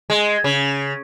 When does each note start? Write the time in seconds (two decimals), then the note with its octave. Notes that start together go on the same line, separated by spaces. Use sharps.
0.10 G#3
0.44 C#3